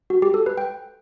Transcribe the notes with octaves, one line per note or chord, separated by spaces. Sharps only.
F#4
G4
A4
B4
G5